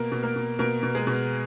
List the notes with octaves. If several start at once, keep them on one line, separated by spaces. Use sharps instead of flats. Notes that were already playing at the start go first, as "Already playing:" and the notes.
Already playing: B2 A#3 A#4
B2
A#3 A#4
B2
B2 A#3 A#4
B2
G#3 G#4
B2